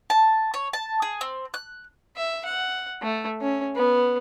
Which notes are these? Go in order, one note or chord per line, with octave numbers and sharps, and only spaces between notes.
A5
C#5
A5
G#4
C4
F#6
E5
F#5
A3
C#4
B3